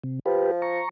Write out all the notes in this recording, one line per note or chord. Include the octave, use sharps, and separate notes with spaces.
C3
F3 G4 B4
A#5 C#6